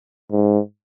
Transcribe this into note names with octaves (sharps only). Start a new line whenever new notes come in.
G#2